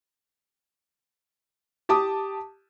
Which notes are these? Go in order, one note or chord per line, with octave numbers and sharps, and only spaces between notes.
G4 A5 D6 D#6